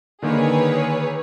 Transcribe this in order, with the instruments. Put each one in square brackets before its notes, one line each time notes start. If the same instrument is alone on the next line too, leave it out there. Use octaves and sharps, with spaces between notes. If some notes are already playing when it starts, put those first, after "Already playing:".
[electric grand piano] D3 D#3 A#3 [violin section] G#4 B4 C#5